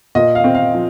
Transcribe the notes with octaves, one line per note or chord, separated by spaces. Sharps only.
A#2 D#5
F5
C4
F5
F3